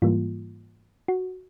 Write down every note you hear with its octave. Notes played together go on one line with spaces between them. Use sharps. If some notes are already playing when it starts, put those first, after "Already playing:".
G#2 E3 G3 A#3 F4
F#4